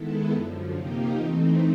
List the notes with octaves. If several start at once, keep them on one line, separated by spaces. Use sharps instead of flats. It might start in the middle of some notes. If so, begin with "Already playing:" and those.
Already playing: D#3 G#3 B3 E4 A4
F#2 D3 F3
C3 F3 A#3 D#4 G4
E3 A3 C4 D#4